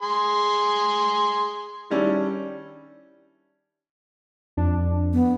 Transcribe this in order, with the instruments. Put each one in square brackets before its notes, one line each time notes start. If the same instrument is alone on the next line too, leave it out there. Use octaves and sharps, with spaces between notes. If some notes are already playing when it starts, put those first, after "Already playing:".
[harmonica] G#4 C6
[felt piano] D#3 G3 C#4 D4 E4
[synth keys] F2 D4
[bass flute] B3